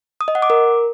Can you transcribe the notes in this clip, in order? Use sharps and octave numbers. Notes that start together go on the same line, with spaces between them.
D#6
D#5
F#5
D6
A#4